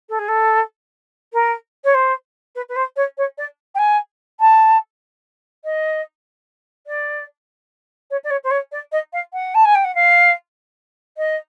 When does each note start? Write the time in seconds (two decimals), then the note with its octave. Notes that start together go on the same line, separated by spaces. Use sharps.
0.09 A4
0.18 G#4
0.28 A4
1.33 A#4
1.84 C#5
1.94 C5
2.55 B4
2.69 B4
2.76 C5
2.96 C#5
3.17 C#5
3.37 D5
3.74 G5
3.78 G#5
4.40 A5
5.64 D#5
6.86 D5
8.10 C#5
8.24 D5
8.30 C#5
8.43 C5
8.50 C#5
8.71 D5
8.92 D#5
9.12 F5
9.33 F#5
9.54 A5
9.65 G#5
9.75 G5
9.84 F#5
9.95 F5
11.17 D#5